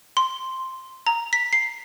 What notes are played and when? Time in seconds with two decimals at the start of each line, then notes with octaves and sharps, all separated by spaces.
0.17 C6
1.07 A#5
1.33 B6
1.53 C7